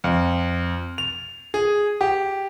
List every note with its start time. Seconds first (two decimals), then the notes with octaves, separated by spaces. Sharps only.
0.04 F2
0.98 F7
1.54 G#4
2.01 G4